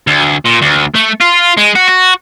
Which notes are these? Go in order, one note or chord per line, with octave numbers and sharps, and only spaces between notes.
D2
A#2
D2
A3
F4
G#3
F#4
F#4